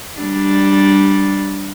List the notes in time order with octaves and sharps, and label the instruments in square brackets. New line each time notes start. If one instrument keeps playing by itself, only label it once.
[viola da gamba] G3 D4